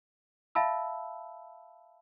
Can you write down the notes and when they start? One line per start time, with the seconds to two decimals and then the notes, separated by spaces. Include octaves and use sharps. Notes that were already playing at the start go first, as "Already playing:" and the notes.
0.55 E5 F5 A5 B5 E6